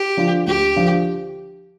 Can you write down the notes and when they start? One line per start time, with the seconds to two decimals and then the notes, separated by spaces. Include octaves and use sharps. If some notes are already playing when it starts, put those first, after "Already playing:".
Already playing: G4
0.17 D3 F3 D4 F4
0.47 D2 G4
0.76 D3 F3 D4 F4